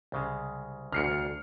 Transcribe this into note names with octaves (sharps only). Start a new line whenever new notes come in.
C2 C#3 G#3
D2 F6 C7 C#7